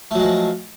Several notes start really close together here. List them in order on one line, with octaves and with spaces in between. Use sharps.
A3 F#3 G#3 F3